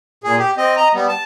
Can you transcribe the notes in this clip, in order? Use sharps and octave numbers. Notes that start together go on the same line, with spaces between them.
A#2 G#4
G4
C4 D#5
D#5 A#5
G3 B3
A5